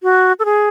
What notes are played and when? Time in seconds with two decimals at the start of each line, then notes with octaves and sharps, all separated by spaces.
0.03 F#4
0.39 A4
0.45 G#4